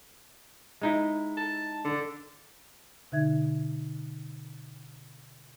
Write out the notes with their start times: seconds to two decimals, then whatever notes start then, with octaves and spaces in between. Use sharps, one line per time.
0.82 G#3 D#4 E4
1.37 A5
1.85 D3
3.12 B2 D3 D#4 E5 G#6